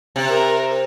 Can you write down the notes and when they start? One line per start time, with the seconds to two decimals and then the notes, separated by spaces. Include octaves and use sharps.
0.16 C3
0.29 A#4